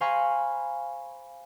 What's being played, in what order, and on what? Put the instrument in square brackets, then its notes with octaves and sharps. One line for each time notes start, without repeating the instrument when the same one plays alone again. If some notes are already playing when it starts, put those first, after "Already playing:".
[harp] C5 F5 G#5 A#5 B5 C#6